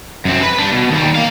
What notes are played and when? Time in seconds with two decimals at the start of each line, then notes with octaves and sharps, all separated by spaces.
0.25 F#2 C4
0.42 B4 B5
0.59 G3 D4
0.72 B2
0.91 D#2 G3
1.15 A#3 F5